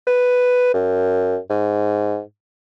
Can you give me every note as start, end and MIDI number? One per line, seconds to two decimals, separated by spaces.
0.07 0.70 71
0.74 1.38 42
1.50 2.20 44